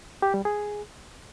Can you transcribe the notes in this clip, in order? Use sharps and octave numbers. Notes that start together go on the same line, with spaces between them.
G4
G3
G#4